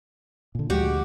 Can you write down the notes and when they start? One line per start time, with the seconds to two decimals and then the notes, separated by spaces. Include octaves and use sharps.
0.55 A#2 D3
0.70 D2 F3 G#3 F#4 G4